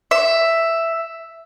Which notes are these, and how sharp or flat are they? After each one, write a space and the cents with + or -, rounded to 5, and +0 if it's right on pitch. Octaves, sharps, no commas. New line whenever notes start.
E5 +5